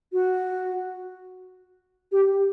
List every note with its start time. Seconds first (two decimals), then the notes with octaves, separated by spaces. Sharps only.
0.13 F#4
2.12 G4